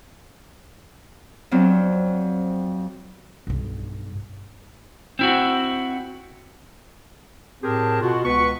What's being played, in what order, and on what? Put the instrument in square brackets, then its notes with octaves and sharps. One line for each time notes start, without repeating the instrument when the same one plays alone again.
[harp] F2 F#3 C4 D4
[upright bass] B1 G2
[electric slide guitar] C4 E4 F#4
[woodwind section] A2 C4 G4 G#4 A#4 A5
B2 F4 F#4
C#2 B3 B4 C#6